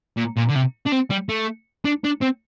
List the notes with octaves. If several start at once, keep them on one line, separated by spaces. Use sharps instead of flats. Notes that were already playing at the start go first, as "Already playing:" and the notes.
A#2
A#2
D3
C3
D4
C4
G3
A3
D4
D4
C4